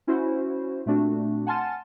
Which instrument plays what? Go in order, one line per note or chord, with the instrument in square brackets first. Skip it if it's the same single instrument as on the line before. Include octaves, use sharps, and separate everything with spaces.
[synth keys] C#4 E4 F#4 C5
A#2 A3 C4 D4 F#4
F#5 G#5 A5 C6 F6 A6